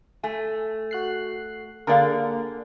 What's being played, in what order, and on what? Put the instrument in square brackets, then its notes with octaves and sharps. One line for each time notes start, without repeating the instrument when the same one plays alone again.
[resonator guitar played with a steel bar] A3 G#5
[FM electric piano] F#4 F#6 C7
[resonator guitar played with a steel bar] D3 D5 F5 [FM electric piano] A#3 G#4 A#4